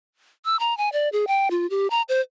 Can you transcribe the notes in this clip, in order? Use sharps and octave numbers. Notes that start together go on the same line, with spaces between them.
E6
A#5
G#5
D5
G#4
G5
F4
G4
A#5
C5